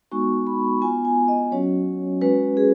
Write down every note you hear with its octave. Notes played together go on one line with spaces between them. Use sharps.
G#3 B3 D#4 F#4 C#6
B5
B3 F4 G#5
G#5
D#5
F#3 C#4 F#4 C#5
G#3 C#4 F#4 B4
G#4